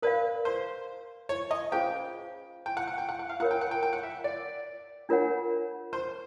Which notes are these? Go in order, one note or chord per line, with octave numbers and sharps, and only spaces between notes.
A#4 B4 D5 F5
C5
C#5
D#5
C#4 F4 G#4 C5 F5 G5
G5
F#5
F#5
G5
F#5
F#5
F5
F4 A#4 C#5 F#5
G5
F#5
G5
G5
F#5
E5
D5
D4 F4 A#4 C#5 F#5
C5